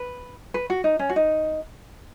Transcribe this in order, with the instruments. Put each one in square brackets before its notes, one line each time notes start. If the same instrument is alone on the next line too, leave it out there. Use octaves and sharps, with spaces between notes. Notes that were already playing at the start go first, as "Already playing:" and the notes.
Already playing: [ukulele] B4
B4
F#4
D#4
C#4
F#4
D#4